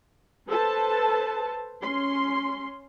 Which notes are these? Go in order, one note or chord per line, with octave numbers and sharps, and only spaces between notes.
A4 B4 C5 A5
C#4 C6